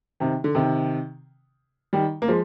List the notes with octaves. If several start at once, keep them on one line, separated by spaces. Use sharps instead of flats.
C3 D#3
D3
C3 D#3
D#3 G3
A#3
F3 G#3